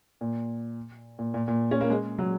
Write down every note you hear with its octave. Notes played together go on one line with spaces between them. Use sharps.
A#2
A#2
A#2
A#2
C#4
A#3
G#3
F#3